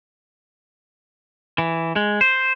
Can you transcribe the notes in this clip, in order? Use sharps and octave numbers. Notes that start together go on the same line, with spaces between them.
E3
G#3
C5